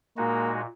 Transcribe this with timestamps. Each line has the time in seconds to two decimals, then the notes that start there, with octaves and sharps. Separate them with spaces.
0.17 A#2 G#3 A#3 D#4 F#4